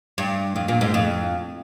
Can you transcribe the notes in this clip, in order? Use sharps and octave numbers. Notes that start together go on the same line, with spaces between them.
G2
F2
A#2
G#2
F2